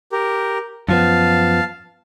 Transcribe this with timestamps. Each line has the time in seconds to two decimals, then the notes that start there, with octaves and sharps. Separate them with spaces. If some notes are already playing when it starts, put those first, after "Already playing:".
0.12 G4 A#4
0.89 F#2 F3 B3 F5 A5